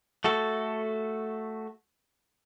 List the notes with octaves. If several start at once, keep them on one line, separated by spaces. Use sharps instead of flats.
A3 F#4 A4